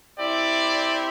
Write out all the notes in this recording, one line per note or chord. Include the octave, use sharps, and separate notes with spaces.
C4 E4 G4 D5